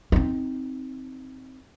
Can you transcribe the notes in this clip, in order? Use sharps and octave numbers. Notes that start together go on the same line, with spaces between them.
C4 D#4